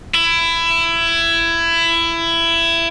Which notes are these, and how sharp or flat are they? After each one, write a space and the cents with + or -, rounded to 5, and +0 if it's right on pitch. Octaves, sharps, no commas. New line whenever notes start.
E4 +20